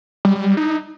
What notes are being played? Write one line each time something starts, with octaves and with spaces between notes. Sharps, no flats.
G3
G3
G3
D#4